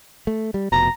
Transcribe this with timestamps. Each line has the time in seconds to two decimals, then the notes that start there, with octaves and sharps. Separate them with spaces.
0.27 A3
0.54 G3
0.72 F1 B2 A#5